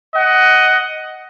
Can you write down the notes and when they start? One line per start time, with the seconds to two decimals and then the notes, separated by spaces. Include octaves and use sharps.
0.14 D#5 F#5